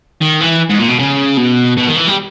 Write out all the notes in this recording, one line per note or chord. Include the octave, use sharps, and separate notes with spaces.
D#3
E3
G#2
A#2
B2
C#3
B2
B2
D#3
E3
G3